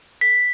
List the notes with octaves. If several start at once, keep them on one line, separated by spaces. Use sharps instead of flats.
B6